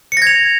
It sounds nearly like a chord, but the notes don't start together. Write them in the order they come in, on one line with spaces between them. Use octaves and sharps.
C#7 A#6 G#6 F7